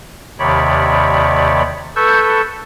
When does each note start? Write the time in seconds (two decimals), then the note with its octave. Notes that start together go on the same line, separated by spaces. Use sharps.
0.39 D#2 C3 D#3 C#5 D5 B5
1.96 A4 B4 C#6 E6 G6